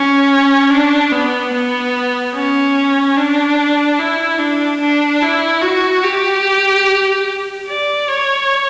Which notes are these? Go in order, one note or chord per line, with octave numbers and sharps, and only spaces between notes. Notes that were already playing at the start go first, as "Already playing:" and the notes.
Already playing: C#4
D4
B3
B3
C#4
D4
E4
D4
D4
E4
F#4
G4
D5
C#5